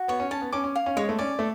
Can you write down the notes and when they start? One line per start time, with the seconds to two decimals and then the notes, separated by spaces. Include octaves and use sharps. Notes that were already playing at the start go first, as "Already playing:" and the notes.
Already playing: F#4
0.08 B3 C#5
0.20 C#4
0.31 C#4 A5
0.41 B3
0.52 C#4 D6
0.64 C#4
0.75 F5
0.86 C#4
0.97 G#3 C#5
1.09 A3
1.19 C#4 D5
1.39 A3